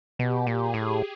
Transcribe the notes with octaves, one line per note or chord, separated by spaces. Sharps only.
B2 G4
A#2
G#4
A2